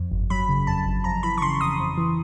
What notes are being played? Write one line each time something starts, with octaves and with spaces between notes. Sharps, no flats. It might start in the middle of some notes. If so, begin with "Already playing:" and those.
Already playing: F2
G1
F#3 B5
C#3
F2 A5
G1
F2 A#5
E3 B5
C#6
C#3 C6
F2 D#6
F2
E3